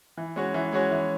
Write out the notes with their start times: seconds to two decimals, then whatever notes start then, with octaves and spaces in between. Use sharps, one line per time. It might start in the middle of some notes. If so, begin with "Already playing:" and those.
0.17 E3
0.36 G#3 C#4 F#4 C#5
0.54 E3
0.72 G#3 C#4 F#4 C#5
0.91 E3